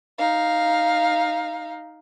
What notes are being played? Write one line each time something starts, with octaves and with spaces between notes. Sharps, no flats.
D#4 F5